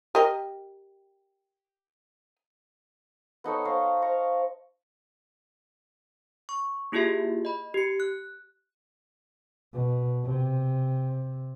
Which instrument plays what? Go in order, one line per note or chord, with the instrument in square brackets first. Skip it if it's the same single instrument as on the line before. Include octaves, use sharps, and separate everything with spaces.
[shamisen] G4 A#4 D#5
[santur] B3 D#4 A4 C#5
C5 F5 A#5 C#6
C5 F5 A#5 C#6
[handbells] C#6
A#3 E4 F4 G4 G#4 E5
D#5 B5
G4 C#7
F#6
[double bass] B2
C3